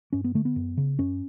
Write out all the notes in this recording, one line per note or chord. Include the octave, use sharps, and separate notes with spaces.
G2 C#4
B3
D3 A3
B3
F#2
C#3
F#2 C#4